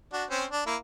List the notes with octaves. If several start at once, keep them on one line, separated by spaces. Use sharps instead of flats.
D4 F#4
C4 C#4 C5
D4
A#3 E4